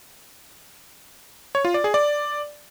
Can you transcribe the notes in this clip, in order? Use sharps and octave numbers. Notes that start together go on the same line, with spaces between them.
C#5
F4
D5
G#4
D5